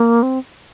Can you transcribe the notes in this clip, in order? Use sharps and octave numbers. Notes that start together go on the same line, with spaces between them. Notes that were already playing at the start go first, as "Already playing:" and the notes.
Already playing: A#3
C4